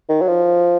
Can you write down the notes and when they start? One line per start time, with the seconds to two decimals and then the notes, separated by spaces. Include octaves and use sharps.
0.09 D#3
0.21 F#3
0.28 F3